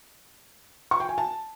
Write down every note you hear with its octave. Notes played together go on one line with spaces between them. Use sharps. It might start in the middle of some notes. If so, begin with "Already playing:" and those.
C#6
G5
G#5
A5